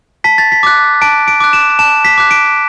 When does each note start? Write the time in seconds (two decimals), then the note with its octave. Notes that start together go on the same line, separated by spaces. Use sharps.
0.24 A5 B6
0.38 A6
0.52 B6
0.63 D6 F#6
1.02 A5 D7
1.28 D7
1.40 D6 F#6
1.53 E7
1.79 A5 E7
2.05 B6
2.18 D6 F#6
2.31 D7